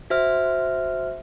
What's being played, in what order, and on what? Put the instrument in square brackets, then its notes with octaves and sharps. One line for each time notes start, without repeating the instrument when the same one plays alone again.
[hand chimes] F#4 C5 E5 F6